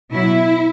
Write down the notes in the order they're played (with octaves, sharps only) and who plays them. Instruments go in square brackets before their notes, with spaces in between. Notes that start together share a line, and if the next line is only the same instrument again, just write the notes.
[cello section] B2 F#3 E4